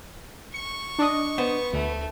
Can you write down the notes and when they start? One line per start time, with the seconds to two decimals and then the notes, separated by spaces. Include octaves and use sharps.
0.54 C#6 C#7
0.99 D4 D#5
1.38 B3 C5
1.73 D2 A3